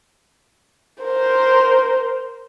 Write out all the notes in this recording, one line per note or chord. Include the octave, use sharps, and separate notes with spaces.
A#4 C5